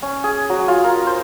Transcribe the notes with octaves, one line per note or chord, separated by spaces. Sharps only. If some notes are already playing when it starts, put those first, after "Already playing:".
C#4
G#4
F#3
F4
A#4
C5